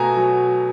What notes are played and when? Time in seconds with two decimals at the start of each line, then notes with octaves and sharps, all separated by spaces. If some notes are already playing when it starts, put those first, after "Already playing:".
Already playing: B2 A3 G#5 A#5
0.16 F#3